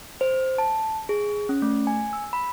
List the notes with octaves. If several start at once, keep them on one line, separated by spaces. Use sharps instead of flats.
C5
A5
G#4
C#4
A3
G#5
E6
B5